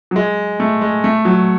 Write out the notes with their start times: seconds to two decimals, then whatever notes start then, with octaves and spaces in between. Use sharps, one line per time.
0.11 F#3
0.16 G#3
0.60 A3
0.82 G#3
1.04 A3
1.25 F#3